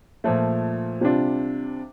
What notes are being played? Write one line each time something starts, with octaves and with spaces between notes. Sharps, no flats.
A#2 F3 A3
C3 G3 D4 F4